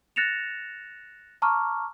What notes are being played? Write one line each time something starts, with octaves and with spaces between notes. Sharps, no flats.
F#6 A6 A#6 C#7 E7 F7
A5 A#5 C#6 D6 F6